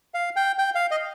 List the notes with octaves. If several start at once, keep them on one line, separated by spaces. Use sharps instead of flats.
F5
G5
G5
F5
D#5